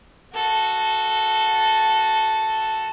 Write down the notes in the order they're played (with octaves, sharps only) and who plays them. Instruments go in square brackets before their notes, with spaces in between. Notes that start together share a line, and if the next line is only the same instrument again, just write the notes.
[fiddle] F#4 A4